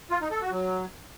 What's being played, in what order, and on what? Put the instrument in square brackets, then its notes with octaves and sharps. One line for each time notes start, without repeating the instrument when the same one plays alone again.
[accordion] F4
D#4
A4
F#4
F#3